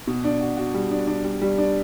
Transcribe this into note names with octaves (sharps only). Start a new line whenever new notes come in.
B2
D4
F#4
F#4
G3
D4
D4
G3
G3
D4